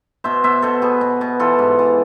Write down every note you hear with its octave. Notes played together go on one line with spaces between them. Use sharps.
B2 C5 E5
B2 C5 E5
B2 A4 C5
B2 G#4 B4
B2
B2
E3 F4 A4
G#2
E3